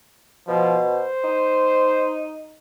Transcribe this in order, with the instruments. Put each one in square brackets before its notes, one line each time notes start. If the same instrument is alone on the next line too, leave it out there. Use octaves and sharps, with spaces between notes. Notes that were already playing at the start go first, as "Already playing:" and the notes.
[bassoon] B2 [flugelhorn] F3
[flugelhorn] C5
[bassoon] D#4